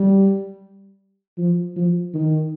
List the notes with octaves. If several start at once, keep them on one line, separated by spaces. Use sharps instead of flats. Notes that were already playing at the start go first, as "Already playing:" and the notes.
Already playing: G3
F3
F3
D#3